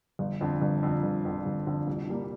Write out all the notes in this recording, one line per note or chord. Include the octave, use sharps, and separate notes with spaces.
G1
F2 D3
G1
F2 D3
G1
F2 D3
G1
F2 D3
C2
A#2 G3 A#3